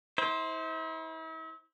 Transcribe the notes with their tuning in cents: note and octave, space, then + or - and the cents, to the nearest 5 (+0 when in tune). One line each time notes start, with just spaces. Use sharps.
E4 -40 C5 +0